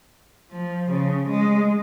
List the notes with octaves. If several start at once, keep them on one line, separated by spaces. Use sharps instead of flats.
F3
C#3
G#3